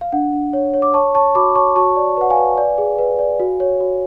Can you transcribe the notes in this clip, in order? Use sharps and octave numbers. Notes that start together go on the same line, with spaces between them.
F5
D4 F#5
D4
C#5
C#5
D6
C#5 A5 C#6
C#5 A5 C#6
F#4 B5 D6
C#5 A5 C#6
F#4 A5 C#6
D5
B4 F#5
F5 G#5
B4
D5
G#4
B4
D5
F#4
C#5
F#4